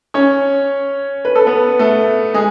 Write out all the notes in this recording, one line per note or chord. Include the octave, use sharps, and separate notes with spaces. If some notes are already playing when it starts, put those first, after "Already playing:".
C#4 C#5
B4
A4
B3 B4
A3 A4
G#3 G#4